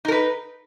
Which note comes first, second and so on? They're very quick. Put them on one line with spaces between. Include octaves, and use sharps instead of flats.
D#4 A#4 B4